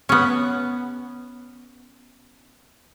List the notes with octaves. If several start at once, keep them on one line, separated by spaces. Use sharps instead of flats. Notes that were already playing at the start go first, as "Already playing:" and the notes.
B3 C#4